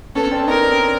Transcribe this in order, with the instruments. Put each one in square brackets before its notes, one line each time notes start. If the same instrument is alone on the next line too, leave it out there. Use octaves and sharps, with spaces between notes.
[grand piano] B3 C#4 [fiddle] A4
[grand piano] C4 D4
D4
[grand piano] C#4 D#4 [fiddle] A#4
[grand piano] C4 D4